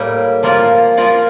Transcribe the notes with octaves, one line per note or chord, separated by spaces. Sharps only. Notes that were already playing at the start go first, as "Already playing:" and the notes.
Already playing: A2 G3 A#3
F3 A#3 F4 A#4 D5
F3 A#3 F4 A#4 D5